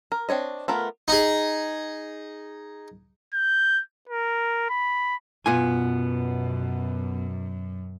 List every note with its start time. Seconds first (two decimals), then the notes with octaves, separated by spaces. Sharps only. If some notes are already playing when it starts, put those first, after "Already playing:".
0.12 A#4
0.29 C4 D4 C#5 D#5
0.68 A3 B3 F4 A#4
1.08 D#4 G#4
3.34 G6
4.09 A#4
4.70 B5
5.46 F#2 B2 B3 F4 G#5